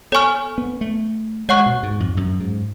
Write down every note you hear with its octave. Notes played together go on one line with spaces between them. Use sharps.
B3 A4 C#5 G#5 C#6 F6
B3
A3
G#3 C#5 F#5 C#6 F#6
B2
G#2
F2
F#2
G#2